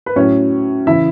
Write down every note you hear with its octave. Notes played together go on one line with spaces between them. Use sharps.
B4
A2 F#3 C#4 C#5
C#3 E3 E4 E5